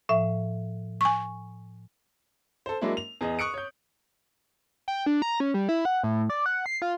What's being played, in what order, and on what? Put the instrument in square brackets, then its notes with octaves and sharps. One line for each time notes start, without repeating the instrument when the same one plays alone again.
[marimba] A2 F3 E5
[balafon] G#5 C#6
[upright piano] A4 C5
F#3 G#3 A#3 D4 E4
F7
E2 G#4 D#5
C#6 D#6 F#6 C#7 D7
C#5 G6
[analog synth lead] G5
D4
A#5
C#4
G3
E4
F#5
A2
D5
F#5
C7
F4